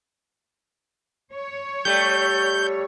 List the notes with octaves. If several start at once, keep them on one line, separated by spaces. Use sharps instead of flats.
C#5
G3 A3 G6